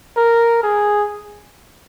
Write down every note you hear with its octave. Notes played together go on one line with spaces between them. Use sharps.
A#4
G#4